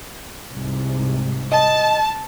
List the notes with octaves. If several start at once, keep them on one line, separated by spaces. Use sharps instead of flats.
C2 G#2 C3
D#5 A5